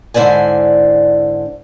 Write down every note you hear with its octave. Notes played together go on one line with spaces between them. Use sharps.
G#2 D3 E4 C5 D5 G#5